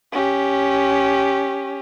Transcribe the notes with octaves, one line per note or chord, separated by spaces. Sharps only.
C#4 G4